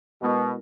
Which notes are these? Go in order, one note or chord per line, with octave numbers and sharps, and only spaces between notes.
B2 G#3 B3 E4 A#4